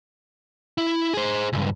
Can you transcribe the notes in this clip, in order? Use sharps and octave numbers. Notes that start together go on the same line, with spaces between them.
E4
G#4 C5
C#2 G2